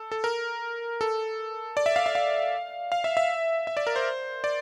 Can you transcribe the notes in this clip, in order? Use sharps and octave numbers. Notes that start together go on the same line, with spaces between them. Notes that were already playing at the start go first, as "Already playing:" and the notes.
Already playing: A4
A4
A#4
A4
D5
E5
F5
E5
F5
F5
E5
E5
E5
D5
A#4
C5
D5